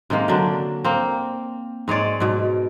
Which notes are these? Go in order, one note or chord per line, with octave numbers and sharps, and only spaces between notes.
C3 D#3 G#3 A#3
D3 F#3 D4
A#3 C4
G#2 G#3 C#5 D5
G#2 B2